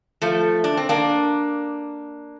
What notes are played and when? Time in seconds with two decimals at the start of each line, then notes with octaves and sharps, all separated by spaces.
0.22 F3 A3
0.64 D4
0.77 C4
0.89 A#3 D4